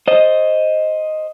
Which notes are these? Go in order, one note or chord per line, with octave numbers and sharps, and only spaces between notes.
C5 D#5